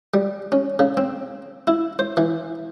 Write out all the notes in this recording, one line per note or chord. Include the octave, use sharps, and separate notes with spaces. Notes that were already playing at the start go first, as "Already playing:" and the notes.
G3
C#4
C#3
C4
E4
C5
E3